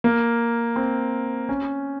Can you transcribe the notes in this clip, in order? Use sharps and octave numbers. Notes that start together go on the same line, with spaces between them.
A#3
C4
C#4